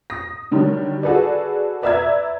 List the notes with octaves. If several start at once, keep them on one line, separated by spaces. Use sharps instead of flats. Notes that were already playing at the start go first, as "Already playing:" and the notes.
D#6 A#6
D3 D#3 F#3 G3
F#4 G#4 A4 B4 D5
B4 D5 E5 A#5 E6 G#6